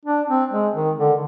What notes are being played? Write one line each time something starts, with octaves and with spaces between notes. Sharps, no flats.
D4
C4
G#3
D#3
D3